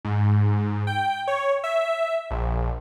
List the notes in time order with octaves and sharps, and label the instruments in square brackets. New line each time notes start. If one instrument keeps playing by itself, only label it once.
[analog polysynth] G#2
G5
C#5
E5
A#1